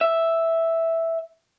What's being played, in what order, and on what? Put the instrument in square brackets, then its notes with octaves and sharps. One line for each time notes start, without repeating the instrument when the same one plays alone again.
[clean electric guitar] E5